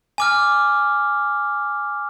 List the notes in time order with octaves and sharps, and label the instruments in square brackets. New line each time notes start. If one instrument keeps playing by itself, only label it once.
[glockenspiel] G#5 D6 F6